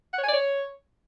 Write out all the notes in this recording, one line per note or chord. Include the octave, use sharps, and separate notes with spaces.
F#5
C#5
G#5
D5
C#5